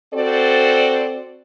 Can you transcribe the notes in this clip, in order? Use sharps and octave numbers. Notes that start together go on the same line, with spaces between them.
C4 F#4 A4 C5 D5